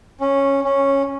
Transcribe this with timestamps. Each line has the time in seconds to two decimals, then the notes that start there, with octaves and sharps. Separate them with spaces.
0.21 C#4
0.64 C#4